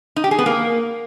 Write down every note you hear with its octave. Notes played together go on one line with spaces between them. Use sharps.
D#4
G4
G#4
B3
A#3